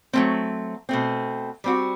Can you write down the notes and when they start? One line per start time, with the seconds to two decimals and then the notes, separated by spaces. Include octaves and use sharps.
0.13 F#3 A3 C4
0.89 B2 A3 C4
1.64 G3 C4 F#4